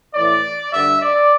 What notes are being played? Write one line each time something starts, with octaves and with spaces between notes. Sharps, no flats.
A2 E3 D5
G2 D3 E5
D5